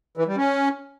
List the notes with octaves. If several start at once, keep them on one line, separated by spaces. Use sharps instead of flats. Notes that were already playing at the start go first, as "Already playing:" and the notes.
E3
G3
C#4